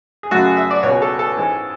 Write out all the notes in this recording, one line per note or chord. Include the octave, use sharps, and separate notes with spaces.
G#4
F#2 C#3 F#3 A3 F#4
G#4
E5
D5
C#2 B2 G#3 C#5
A4
A4
G#2 E3 G#3